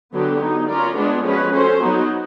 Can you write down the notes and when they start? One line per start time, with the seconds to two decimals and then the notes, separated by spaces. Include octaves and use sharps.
0.12 D3 F#3 B3 D4 G4
0.40 F#3 B3 D#4
0.68 C#4 F4 A#4 D5
0.96 G#3 B3 D4 F4 G#4
1.24 F3 G#3 C#4 F#4 B4
1.52 C#4 F#4 A4 C5
1.80 F#3 B3 D#4 F#4